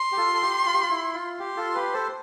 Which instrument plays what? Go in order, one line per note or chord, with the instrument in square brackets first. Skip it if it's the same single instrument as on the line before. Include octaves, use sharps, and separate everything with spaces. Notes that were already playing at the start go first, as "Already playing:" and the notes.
Already playing: [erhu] C6
[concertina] G4
F4 A4
A4
G4
F4
G4
F4
E4
F4
[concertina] G4 [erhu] C6
[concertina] F4 A4
G4 B4
A4 C5